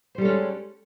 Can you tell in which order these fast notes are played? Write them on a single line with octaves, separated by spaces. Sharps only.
C5 G3 A4 C#4 G#3